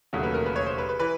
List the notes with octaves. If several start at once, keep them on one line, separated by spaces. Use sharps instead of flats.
E1 D#2 C#3 F#3 A3
B4
A#4
B4
C#5
C5
B4
B4
E3 B4